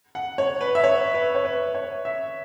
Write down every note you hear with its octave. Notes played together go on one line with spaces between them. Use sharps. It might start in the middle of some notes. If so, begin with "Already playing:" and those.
F#5
C#5
B4
E5
C#5
B4
C#5
B4
C#5
E5